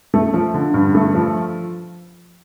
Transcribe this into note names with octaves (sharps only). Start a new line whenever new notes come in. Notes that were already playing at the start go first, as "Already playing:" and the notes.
A3
F3
D3
G2
A3
F3